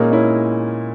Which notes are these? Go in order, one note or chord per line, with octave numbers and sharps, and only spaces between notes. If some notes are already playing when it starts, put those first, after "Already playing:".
Already playing: A#2 G#3 A#3 C#4 D#4 A#4
C#4 E4